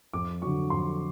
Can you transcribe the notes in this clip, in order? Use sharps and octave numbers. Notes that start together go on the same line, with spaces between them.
F2 D6
D3 F#3 C#6
F2 C6